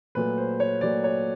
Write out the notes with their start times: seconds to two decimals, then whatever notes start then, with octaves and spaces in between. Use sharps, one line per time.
0.15 A#2 F#3 A3 B4
0.38 C5
0.60 C#5
0.81 A#2 F#3 A3 D5
1.04 C#5